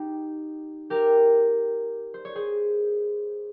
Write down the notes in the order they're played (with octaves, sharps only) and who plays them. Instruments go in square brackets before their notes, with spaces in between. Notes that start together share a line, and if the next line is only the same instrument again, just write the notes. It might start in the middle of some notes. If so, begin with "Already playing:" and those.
Already playing: [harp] D#4 G4
G4 A#4
C5
C#5
G#4 C5